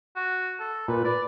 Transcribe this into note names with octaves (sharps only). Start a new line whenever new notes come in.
F#4
A4
A#2 B4
B4 D5